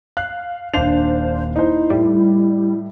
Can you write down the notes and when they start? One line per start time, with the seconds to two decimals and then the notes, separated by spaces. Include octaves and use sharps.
0.17 F5 F#6
0.74 D#1 D4 C5 F5 F7
1.56 D#4 E4 C5
1.90 A2 G3